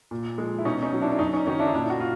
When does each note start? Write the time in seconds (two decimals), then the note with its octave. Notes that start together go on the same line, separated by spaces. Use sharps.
0.11 A#2
0.37 F3 G#3
0.58 E4
0.65 B2 C#4 D#4
0.83 C#4 D#4
0.92 F#3
1.01 D4 E4
1.12 D4
1.19 F#2 C#4 D#4
1.33 C#4 D#4
1.46 D#3 F#3 C#4 D#4
1.59 D4 E4
1.67 D#4
1.73 A#2 D4 E4
1.90 F#4
2.00 F4